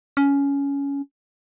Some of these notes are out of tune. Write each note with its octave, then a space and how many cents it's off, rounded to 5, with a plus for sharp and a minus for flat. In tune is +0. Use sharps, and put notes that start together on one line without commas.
C#4 +15